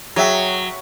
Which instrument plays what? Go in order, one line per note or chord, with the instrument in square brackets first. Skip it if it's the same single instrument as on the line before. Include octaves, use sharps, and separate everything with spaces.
[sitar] F#3 [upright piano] G#4 E5 G5